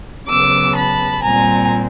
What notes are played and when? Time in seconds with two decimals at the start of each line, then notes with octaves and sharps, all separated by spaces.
0.28 C#3 F#3 B3 D6 E6
0.75 A5 B5
1.23 A#2 G3 C4 G#5 A#5